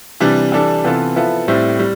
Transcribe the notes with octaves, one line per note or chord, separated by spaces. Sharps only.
C3 E3 G3 D4
E3 G3 D4 A4
C3 E3 B3 F4 A4
F3 B3 E4 A4
A2 G3 C4 E4
G3